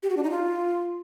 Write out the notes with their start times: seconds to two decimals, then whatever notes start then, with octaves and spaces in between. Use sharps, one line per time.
0.03 G4
0.10 F#4
0.17 D4
0.24 D#4
0.30 F4